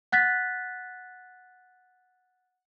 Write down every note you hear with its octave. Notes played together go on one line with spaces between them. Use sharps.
F#5 F#6 A6 B6